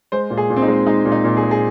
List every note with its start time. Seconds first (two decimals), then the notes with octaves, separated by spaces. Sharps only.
0.12 G#3 C5
0.30 A#2
0.37 G#4
0.50 A#2
0.56 C4
0.62 D#4
0.68 G#3
0.86 G#3 D#4
1.05 A#2
1.12 D#4
1.24 A#2
1.37 G#4
1.43 G#3
1.51 G#4